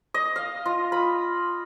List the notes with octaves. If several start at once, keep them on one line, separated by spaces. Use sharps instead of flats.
D#5
F5
F4
B5